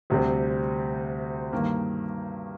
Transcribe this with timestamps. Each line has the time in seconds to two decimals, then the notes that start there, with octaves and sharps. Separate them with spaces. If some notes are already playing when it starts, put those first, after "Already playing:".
0.10 D2 C3 G3 C4
1.53 G2 D#3 A#3